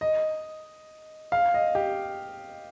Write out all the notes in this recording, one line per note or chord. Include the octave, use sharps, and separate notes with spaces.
D#5
F5
D#5
G4